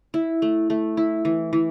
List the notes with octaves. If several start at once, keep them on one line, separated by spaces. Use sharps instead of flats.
E4
A3
A3
E4
E3
E3